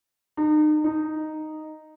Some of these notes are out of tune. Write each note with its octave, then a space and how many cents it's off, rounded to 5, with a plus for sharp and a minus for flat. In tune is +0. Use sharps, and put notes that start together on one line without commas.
D#4 -35
D#4 -5